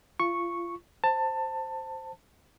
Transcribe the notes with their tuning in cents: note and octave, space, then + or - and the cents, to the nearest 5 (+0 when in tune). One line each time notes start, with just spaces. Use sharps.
F4 -25 C#6 -5
C5 +0 A5 +20